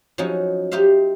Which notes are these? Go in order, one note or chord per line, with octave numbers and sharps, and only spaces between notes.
F3 F#3 C#4 D#4
D#4 G4 C5 E5 F5